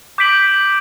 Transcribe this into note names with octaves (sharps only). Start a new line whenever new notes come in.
D6 G6 B6 D7 F#7